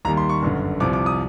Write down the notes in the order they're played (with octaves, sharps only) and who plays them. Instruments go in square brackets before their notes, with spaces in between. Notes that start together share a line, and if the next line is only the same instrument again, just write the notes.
[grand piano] D#2 D#3 G3 A#5
C6
C#6
G1 F#2 D3
C2 C3 F3 D6
D6
D#6